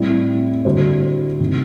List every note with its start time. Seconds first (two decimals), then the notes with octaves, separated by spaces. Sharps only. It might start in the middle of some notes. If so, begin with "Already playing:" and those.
Already playing: A2 G3 C4
0.65 D3 G3 D4 F#4 C5
1.40 C3 D#3